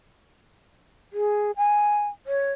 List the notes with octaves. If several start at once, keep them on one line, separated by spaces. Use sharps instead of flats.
G#4
G#5
C#5